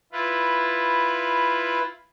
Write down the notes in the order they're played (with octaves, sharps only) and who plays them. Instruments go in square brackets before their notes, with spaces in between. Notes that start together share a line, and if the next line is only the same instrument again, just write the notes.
[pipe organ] E4 F4 B4